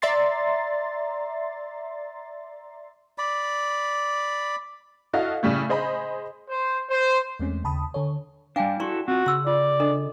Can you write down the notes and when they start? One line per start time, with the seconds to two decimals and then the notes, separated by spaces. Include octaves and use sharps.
0.02 D5 E5 A#5 C6 A6 C7
3.18 D5 B5
5.13 E4 F#4 A4 D#5 F5
5.43 A2 C#3 G3 A3
5.69 G#4 C5 D#5 B5
6.50 C5
6.90 C5
7.40 E2 G#3 A3 C4 C#4
7.64 D#2 C#3 A5 B5 D#6
7.94 D3 A4 C#5
8.56 G3 D4 F5 G5 G#5
8.80 E4 F#4 A4 D5 C6 C#6
9.08 C4 F4 F#4
9.26 C#3 C6 E6
9.47 F4 D5
9.80 D4 A4 D#5